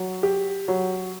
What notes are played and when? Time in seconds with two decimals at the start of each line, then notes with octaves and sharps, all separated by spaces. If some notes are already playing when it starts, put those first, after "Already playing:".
Already playing: F#3
0.23 G4
0.68 F#3